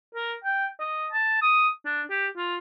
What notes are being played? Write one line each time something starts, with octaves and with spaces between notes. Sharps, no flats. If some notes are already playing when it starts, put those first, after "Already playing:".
A#4
G5
D#5
A5
D#6
D4
G4
F4